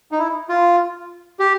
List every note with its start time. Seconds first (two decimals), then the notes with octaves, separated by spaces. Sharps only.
0.12 D#4
0.19 E4
0.49 F4
1.39 G4